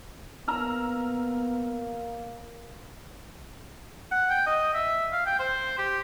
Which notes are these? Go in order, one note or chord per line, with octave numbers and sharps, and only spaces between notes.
A#3 B3 A#5 E6 F6
F#5
G5
D#5
E5
F5
G5
C5
G4